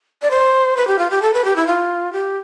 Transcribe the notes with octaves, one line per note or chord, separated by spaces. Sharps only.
D5
C5
B4
G4
F4
G4
A4
B4
G4
E4
F4
G4